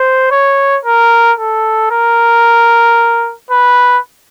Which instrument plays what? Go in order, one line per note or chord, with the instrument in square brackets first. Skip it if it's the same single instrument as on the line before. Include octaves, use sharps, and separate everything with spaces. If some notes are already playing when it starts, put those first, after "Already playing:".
Already playing: [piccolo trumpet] C5
C#5
A#4
A4
A#4
B4